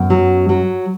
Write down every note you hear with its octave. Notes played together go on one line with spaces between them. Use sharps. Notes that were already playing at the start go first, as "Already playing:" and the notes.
Already playing: F#2 B3
F#3
F#3